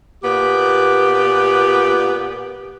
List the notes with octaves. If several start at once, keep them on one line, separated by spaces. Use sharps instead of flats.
A#2 B3 G4